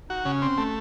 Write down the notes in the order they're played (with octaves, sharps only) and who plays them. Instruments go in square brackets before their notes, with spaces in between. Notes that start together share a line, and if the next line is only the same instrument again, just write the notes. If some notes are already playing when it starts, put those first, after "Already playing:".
[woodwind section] D#4 [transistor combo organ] F#4
[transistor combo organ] C#3 [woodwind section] C#4
[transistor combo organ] C4
A3